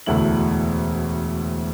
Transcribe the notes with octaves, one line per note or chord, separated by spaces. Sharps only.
E1 D2 A3 E4 F#7